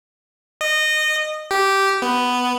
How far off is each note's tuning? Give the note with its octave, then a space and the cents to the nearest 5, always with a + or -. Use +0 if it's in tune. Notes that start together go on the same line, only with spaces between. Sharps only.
D#5 -20
G4 -10
B3 +5